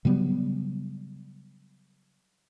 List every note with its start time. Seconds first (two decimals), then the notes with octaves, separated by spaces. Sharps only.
0.05 C#3 F#3 G3 B3